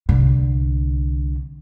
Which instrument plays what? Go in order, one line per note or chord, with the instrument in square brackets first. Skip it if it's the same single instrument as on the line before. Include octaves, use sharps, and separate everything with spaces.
[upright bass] C2 D3